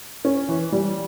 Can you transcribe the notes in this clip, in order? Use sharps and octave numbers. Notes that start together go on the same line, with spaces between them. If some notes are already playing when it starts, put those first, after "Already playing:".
C#4
E3
G3